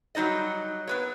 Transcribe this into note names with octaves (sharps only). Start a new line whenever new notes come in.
F#3 G3 D#4 D5 D#5
B3 B4 C#5